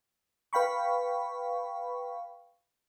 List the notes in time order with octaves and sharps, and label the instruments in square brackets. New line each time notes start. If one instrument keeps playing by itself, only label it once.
[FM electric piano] B4 F5 G5 B5 C#6